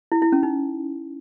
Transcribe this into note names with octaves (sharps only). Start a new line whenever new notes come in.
E4
E4
C#4
D#4